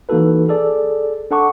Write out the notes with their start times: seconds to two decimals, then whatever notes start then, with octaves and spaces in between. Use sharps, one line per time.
0.09 E3 A#3 D#4 F#4 A4 B4
0.49 G#4 A4 D5
1.31 D4 A4 F#5 A5 C#6 D6